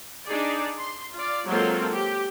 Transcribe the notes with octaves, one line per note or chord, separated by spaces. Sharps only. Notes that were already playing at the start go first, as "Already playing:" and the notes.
D4 D#4 G#4 D5
C6
F4 D5
F#3 G#3 A#3 C4 F4 A4
G4